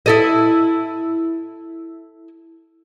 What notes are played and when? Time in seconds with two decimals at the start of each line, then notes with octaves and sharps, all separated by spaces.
0.06 E4 A4 D#5